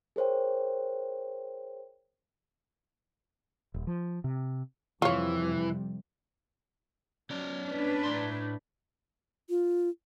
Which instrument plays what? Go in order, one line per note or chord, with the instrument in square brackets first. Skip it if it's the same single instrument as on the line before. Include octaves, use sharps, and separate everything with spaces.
[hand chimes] G#4 A#4 C5 C#5 G5
[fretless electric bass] D#1
F3
C3
[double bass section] F2 C3 G3 [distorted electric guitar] E3 [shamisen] F4 C#5
[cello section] F#3 [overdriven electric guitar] C#4 D5
[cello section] D4 B4
[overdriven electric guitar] A2 C6
[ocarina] F4